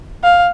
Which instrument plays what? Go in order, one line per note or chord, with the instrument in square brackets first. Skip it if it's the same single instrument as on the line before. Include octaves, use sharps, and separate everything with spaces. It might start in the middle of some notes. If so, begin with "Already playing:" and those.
[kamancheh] F5